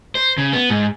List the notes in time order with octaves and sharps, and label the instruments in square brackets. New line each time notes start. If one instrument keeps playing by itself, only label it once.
[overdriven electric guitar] C5
C#3
B3
G#2